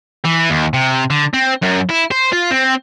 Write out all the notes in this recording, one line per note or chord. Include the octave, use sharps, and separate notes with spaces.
E3
D#2
C3
D3
C4
F#2
E4
C5
F4
C4